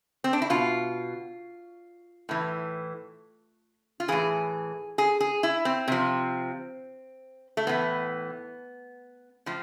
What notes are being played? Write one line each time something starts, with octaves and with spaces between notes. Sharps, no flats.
C4
D4
E4
B2 F4
A2 E3
F4
A2 E3 G#4
G#4
G#4
E4
C4
C3 F3
A3
A2 E3 B3
A2 F3